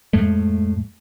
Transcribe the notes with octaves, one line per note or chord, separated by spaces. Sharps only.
F2 A2 G#3 A3